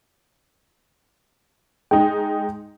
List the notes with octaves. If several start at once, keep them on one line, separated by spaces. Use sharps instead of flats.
G#3 D#4 G5